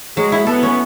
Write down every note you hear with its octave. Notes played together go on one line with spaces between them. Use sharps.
F#3 G#3
E4
B3 A4
C#4